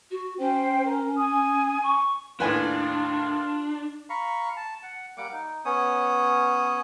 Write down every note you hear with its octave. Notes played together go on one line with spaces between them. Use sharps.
F#4
C#4 C5 G5
A#4
G#5 D#6
C#6
D#2 A2 D4 F4 B4 G#5
F5 A#5 B5 C#6
A5
F#5
G3 A#3 F#5 D6
D#4
B3 C#4 C#5 D#6